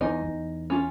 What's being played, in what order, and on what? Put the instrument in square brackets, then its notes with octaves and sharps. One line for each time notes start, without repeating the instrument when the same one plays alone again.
[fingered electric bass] E2 [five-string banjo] D#4 D#5 G#5
[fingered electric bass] E2
[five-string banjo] C#4 F4